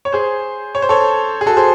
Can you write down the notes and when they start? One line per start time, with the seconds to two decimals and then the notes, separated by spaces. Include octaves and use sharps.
0.05 C#5
0.12 G#4 C5
0.75 C#5
0.82 C5
0.89 A4 C#5
1.41 G#4
1.46 F#4 A4
1.57 G#4 C5